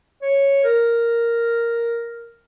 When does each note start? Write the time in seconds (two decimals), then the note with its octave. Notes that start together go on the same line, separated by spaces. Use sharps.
0.22 C#5
0.64 A#4